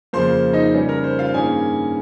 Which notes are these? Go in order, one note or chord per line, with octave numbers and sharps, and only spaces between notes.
F2 C#3 F3 A#3 C5 C6
D#4 D#5
C#3 G3 C#4
A#4
C5
F4 F5
G2 D#3 A#3 C#4 G#4 G#5